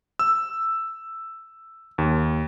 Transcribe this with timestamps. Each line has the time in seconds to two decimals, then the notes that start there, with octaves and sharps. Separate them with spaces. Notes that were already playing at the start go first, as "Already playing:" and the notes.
0.19 E6
1.98 D#2